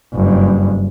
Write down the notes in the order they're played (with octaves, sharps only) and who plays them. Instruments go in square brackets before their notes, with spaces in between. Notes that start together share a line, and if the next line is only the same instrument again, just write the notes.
[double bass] F#1 G2